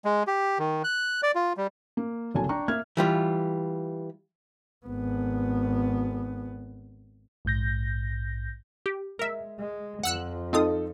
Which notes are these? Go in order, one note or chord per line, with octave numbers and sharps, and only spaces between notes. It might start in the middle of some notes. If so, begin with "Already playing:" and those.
G#3
G4
D#3
F#6
D5
F4
G3
A#3
F#1 C2 D3 F#3 G#5 A5
D4 G5 A#5 C#6
A#3 E5 F6 G#6
E3 G3 F4
G#1 B3
A#1 G#2 G6 A#6
G4
G#3 A#4 E5
G#3
F2 F3 F#5 E6 F#6
C4 D#4 F4 A4 D#6